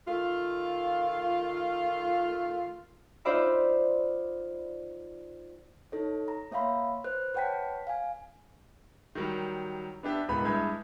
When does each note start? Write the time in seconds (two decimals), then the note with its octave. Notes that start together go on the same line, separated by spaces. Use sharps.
0.07 D#3 A3 F4
3.25 D#4 F4 C5 D5 E5 B5
5.92 D#4 A4 C#5
6.28 A#5
6.51 A#3 C#5 E5 F5 B5 C6
7.04 B4 C5 F#6
7.34 B4 C#5 F#5 G5 A5 B6
7.87 F5 G#5
9.15 D#3 F#3 G3
10.03 B3 D4 G4 E5
10.28 E1 C#2 A2 B3 B5
10.45 G2 G#3 E4 B5 G6 G#6